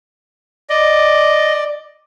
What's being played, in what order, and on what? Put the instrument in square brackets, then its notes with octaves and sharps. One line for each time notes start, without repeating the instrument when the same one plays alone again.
[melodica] D5 [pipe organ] D#5